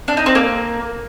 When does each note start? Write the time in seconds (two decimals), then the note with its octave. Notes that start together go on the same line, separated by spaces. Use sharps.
0.08 D4
0.17 D#4
0.26 C4
0.35 A#3